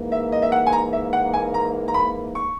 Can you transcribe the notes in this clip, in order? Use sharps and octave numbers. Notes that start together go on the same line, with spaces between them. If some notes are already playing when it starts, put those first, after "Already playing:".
Already playing: G#2 E3 A#3
E5
D#5
E5
F#5
G#5
A#5
E5
F#5
G#5
A#5
A#5
B5
C#6